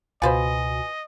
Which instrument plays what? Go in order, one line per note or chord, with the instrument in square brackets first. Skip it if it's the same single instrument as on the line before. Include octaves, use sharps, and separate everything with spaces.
[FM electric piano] C#2 B2 F#4 [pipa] F4 B4 C5 [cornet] D#5 [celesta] G#5